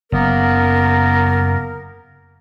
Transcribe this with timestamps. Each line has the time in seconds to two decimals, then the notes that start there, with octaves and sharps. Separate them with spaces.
0.12 F#1 A#3 B3 A#4